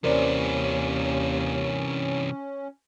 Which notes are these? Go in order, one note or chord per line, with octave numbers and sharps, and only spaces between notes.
D#2 C3 E3 C#4 A#4 C5 D5